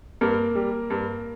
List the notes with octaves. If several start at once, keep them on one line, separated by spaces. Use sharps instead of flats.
G2 A#3 A#4
G3
G2